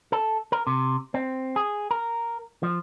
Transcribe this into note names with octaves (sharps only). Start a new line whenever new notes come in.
A4
A#4
C3
C4
G#4
A#4
F3